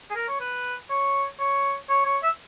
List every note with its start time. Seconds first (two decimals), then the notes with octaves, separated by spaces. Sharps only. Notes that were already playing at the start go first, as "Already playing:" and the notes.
0.10 G#4
0.15 A#4
0.28 C#5
0.40 B4
0.90 C#5
1.40 C#5
1.89 C#5
2.06 C#5
2.23 E5